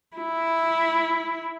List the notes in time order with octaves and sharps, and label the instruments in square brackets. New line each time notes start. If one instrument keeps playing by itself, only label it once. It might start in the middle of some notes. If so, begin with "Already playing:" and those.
[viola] E4